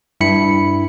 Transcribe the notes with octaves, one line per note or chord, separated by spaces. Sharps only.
G2 E4 B5 C#7